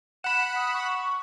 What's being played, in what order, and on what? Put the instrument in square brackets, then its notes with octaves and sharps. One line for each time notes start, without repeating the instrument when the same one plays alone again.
[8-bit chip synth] F#5 B5 [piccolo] E7
[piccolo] D#6
C#6